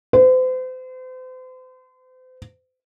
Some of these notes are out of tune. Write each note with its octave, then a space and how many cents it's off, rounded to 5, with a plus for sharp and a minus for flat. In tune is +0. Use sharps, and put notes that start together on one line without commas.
C5 -40